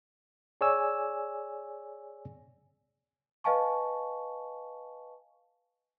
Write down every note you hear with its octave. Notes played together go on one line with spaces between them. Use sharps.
G#4 C#5 D5 G#5 E6
B4 D#5 F5 G#5 A5 C#6